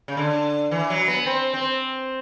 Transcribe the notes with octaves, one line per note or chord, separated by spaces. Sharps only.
C#3
D3
E3
F#3
B3
C4
C4